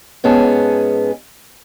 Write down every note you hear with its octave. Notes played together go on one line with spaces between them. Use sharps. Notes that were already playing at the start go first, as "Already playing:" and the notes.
G#2 B3 C#4 G#4 A5